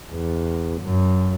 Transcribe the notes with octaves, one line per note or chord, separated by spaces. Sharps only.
E2
F#2